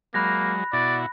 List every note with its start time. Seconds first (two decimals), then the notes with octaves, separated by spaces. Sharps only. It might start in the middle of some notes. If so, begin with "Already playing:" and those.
0.14 F#3 G#3 A#3 B5 F#6 A#6
0.73 B2 E4 F#4 D5